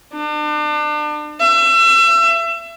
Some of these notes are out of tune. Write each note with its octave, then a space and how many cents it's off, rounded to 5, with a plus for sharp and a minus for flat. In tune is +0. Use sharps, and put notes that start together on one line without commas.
D4 +35
E5 +30